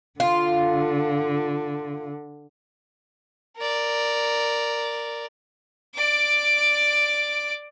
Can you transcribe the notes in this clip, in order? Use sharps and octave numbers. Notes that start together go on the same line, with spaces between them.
D3 F4
A#4 D5
D5 D6